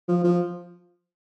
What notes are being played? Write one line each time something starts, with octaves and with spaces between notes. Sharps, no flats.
F3
F3